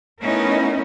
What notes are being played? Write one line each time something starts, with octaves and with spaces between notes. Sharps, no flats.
A3 B3 C#4 D#4 E4 A#4